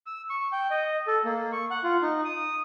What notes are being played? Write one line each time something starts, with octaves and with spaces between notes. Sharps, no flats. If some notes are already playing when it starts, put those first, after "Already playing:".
E6
C#6
G5
D#5
A4
A#3
C#6
F#5
F4
D#4
D#6